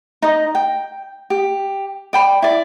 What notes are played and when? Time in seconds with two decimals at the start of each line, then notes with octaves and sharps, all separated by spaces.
0.22 D#4 D#5
0.55 G5
1.30 G4
2.13 D5 G5 B5
2.42 E4 D5